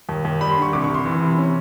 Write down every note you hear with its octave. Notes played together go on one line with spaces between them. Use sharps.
D#2
D#2
G3 B5
C6
D3
C#6
C2 D6
C#6
C2 C6
E3
C3
C#4